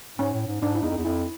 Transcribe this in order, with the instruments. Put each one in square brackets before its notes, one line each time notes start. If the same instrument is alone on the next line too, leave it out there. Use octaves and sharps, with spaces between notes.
[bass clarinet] G#2 [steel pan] C#4
[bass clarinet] A2
G#2
[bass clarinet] G#2 [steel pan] D4
[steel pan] E4
[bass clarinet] E2 [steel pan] D#4
[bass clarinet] F2
E2
[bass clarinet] F2 [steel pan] E4